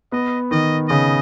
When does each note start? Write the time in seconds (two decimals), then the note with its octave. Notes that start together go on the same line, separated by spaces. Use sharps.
0.12 B3 D#5
0.51 D#3 D#5
0.89 C#3 D#5